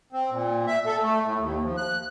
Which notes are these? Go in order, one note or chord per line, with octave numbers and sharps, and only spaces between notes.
C4
A#2
E5
A4
A3
A2
D#2
F3
F#6